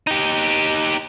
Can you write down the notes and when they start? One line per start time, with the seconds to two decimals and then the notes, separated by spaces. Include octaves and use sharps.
0.07 D#4 G4